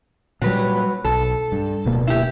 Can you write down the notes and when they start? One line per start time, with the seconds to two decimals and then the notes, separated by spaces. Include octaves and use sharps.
0.42 A#2 F#3 G3 B4
1.05 B1 A4
1.52 G2
1.85 D1 B2 A#3
2.07 E4 G4